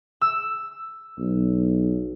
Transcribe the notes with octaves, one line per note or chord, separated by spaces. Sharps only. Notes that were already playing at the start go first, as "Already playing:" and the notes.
E6
B1